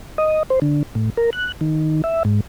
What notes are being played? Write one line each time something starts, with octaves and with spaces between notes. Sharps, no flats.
D#5
C5
D3
A2
A#4
F#6
D#3
E5
G#2